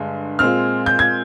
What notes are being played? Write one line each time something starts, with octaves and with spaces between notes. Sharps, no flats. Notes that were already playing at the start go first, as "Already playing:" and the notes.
Already playing: G2 D3 G#3
A#2 G#3 C4 F6
G6
G#6